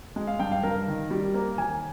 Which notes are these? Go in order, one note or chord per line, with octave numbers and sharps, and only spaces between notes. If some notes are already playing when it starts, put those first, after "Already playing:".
G#3
F5
G2 G5
F5
G2 A#4
D#3
G3
A#3
D#2 G#5